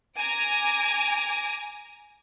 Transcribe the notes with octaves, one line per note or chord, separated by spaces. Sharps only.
G#5 A#5 D6